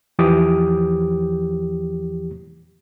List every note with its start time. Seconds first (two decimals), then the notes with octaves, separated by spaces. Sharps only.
0.19 E2 E3 F3 G4 D6 D#6